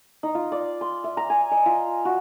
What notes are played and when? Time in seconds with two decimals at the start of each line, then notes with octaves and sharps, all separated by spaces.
0.23 D#4
0.35 F4
0.52 D5
0.81 C6
1.04 E5
1.17 A#5
1.30 G#5
1.51 D#5
1.66 F4
2.05 F#4